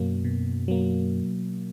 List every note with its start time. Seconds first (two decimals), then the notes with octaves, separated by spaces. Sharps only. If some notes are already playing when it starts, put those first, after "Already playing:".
Already playing: F#2 B2 F#3 A#3
0.24 B2
0.68 F#3 A#3